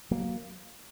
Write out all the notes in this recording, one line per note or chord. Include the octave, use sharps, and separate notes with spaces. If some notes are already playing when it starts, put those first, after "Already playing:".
F#3 A#3